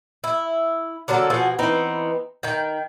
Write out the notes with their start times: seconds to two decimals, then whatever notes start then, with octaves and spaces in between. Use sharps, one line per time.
0.24 E4
1.08 D3 F#3 A#3 A4
1.30 B2 F3 F#4 G#4
1.59 E3 B3 C4 D#4
2.43 D#3 G5